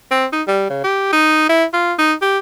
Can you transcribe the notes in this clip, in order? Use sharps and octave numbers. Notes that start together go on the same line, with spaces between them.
C4
D#4
G3
C#3
G4
D#4
E4
F4
D#4
G4